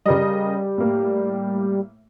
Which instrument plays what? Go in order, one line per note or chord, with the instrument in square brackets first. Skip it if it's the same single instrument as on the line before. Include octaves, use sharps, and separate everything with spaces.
[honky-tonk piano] C#3 A#4 D#5 [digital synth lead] G3
[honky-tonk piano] A2 A#3